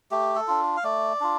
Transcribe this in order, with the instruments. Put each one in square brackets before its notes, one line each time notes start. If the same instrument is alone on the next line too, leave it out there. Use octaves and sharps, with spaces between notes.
[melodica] A3 G4
A4
D4 F4
F5
A3 D5
D4 F4